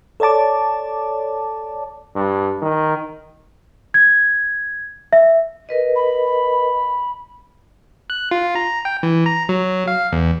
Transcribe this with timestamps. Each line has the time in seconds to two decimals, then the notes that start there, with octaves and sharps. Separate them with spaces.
0.20 A4 C#5 D5 A5 D6
2.15 G2
2.62 D#3
3.94 G#6
5.13 E5
5.69 A#4 B4 D#5
5.96 B5
8.10 F#6
8.31 F4
8.55 A#5
8.85 G5
9.03 E3
9.26 A#5
9.49 F#3
9.88 F5
10.12 E2